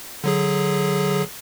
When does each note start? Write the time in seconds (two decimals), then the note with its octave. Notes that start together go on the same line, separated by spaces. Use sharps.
0.24 D3 F#3 G#4